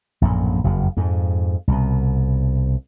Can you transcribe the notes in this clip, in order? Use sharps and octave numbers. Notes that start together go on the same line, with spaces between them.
A#1 F#2 A2
F#1 F2
F2 G#2
C2 B2